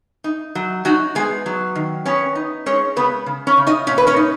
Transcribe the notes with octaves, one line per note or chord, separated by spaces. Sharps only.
D#4
F#3
F#3 D#4 F#4
G#3 B3 G#4
F#3
D#3
B3 C#4 C#5
D#4
G#3 C#4 C#5
C#3 B3 B4
C#3
C#4 C#5
C#3
D#4 D#5
A#2 C#4 C#5
B4
C#4 C#5
D#4